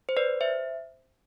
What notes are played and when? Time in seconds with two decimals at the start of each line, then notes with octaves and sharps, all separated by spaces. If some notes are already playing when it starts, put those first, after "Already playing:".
0.09 C5
0.17 B4 D5
0.41 C5 E5